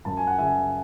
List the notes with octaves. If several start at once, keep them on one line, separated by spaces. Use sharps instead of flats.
F#2 A5
G#5
F#5
C#3 E5 G#5